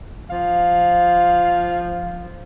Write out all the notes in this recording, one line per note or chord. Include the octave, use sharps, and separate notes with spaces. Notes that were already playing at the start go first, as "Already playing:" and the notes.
F3 F5